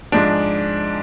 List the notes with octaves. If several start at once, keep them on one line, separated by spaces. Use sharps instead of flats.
G#2 F3 G#3 D4